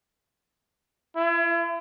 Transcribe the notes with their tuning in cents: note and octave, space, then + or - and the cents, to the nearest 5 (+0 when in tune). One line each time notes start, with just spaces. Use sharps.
E4 +40